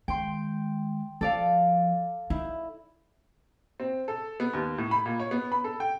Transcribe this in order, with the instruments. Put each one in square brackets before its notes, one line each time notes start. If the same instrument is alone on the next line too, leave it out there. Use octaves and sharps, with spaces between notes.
[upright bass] D#3 G#3 [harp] G5 C6
[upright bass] F3 [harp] A4 D5 F5
[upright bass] D#4 [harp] E4
[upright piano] C4
A4
B3
D#2
A2
B5
A#2
C#5
B3
B5
A4
G5